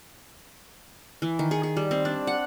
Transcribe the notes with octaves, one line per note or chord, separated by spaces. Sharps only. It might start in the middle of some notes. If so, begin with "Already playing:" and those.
E3
D#3
G#4
G#4
G3
C4
D4
F#5